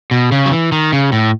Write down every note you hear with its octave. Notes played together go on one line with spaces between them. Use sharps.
B2
C#3
F#3
E3
D#3
C#3
A2